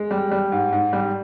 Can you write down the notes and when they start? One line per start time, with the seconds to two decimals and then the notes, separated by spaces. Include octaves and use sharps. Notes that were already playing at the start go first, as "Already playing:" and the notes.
Already playing: G#3
0.11 G3
0.31 G3
0.52 G#2
0.72 G#2
0.93 G3